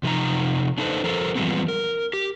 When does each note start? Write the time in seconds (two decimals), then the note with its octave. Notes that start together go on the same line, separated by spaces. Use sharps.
0.03 C3 F3 D#4 A#5
0.78 D4 D#4 A4 B4 C5 D#5
1.04 F3 A4 A#4 C5
1.36 E3 F3 G3 G#3 B3 C4
1.68 A#4
2.13 G4